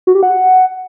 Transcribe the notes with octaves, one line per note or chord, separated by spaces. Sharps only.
F#4
G4
F#5